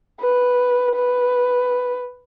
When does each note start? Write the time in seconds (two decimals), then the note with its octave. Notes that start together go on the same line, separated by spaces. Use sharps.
0.21 B4
0.95 B4